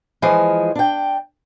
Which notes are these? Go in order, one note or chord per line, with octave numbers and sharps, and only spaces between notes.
E3 F3 G#3 G#4
D4 G5